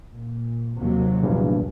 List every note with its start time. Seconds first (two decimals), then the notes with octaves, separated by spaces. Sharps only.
0.15 A#2
0.78 D#2 C3 F#3
1.23 A#1 E2 G2